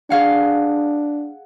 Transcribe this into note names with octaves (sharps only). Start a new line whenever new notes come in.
D4 G#4 F5 F#5